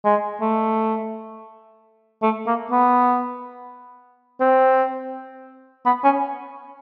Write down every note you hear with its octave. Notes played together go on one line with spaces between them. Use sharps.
G#3
A3
A3
A#3
B3
C4
B3
C#4